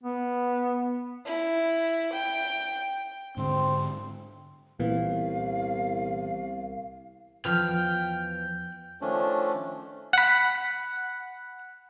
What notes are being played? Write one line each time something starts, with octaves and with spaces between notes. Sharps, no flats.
B3
E4
G5
G#2 D3 C4
C2 A#2 E3 B3 F5
E2 F3 B4 G5 F6
D#3 F3 A3 C#4 D4
F#5 B5